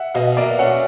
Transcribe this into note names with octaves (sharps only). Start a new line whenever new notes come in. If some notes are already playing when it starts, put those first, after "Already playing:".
Already playing: E5 F#5
B2 D#5 F5
A#3 D5 E5
C#4 E5 F#5